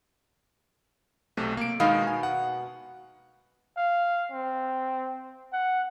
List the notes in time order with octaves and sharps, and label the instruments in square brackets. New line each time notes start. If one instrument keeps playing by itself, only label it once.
[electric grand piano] B1 C3 A3
A#3 D7
[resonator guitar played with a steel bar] B2 D#4 F5 [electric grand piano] D#3 G#3
[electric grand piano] G#5
F#5
[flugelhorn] F5
C4
F#5